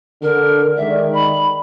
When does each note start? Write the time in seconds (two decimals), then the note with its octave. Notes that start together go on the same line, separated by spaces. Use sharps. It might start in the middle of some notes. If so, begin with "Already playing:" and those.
0.22 D3 A#4
0.78 D#3 G#3 D5 E5
1.14 B5